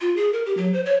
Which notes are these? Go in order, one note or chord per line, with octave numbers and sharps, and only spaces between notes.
F4
G#4
A#4
G4
F#3
C5
C#5